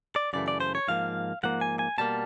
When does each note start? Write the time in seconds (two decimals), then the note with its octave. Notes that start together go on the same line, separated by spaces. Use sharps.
0.16 D5
0.33 F#2 C#3 E3 A3 D5
0.48 D5
0.60 C5
0.75 C#5
0.88 G#2 F3 A#3 F5
1.43 G#2 F3 A#3 F#5
1.61 G#5
1.79 G#5
1.98 B2 G3 A#3 A5